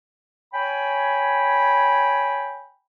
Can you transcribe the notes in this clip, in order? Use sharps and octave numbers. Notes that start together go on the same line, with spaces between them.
C#5 G5 G#5 B5